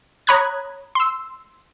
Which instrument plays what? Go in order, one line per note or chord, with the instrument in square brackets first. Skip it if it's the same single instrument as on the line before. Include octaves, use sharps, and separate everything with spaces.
[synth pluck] C#5 A#5 B5 D#6 F#6 G#6
C6 E6